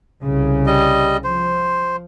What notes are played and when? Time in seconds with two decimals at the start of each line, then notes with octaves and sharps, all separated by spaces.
0.23 C2 C#3
0.66 G3 D#5
1.24 F3 C5